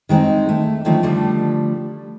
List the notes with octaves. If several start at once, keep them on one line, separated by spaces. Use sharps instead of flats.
D#3 G#3 C4 C#4 D#4
A3
D3 D#3 F3 A3 C#4
D3 F3 G3 A3